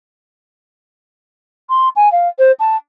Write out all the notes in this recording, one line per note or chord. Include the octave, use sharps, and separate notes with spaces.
C6
G#5
F5
C5
A5